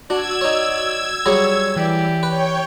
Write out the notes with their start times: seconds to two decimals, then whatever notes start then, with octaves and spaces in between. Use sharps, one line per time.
0.10 D4 F#4 D5 E6 G#6
0.41 D#4 C#5
1.26 F#3 G3 G#4 C#5
1.76 E3 G4 D5
2.23 B4 C#5 G5